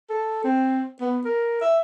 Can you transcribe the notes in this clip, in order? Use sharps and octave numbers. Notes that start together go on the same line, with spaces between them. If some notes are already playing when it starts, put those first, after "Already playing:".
A4
C4
B3
A#4
E5